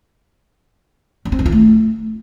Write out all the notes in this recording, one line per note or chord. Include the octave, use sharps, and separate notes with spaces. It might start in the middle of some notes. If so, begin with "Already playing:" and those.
C#4
C4
D#3
F4
A3